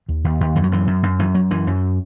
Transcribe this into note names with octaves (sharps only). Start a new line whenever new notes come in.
D#2
D#2
D#2
F#2 E3
F#3
F#2 E3
F#2
F#2
F#2 E3
F#2 F#3
F#2 E3
F#2